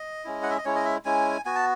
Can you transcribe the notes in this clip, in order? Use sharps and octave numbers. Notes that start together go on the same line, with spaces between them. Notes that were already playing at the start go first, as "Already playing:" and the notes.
Already playing: D#5
G#3 C#4 E4
F#5
E5
D#5
G#3 C#4 E4 C#5
D#5
E5
G#3 C#4 E4 G#5
B3 F#4 G#5
A5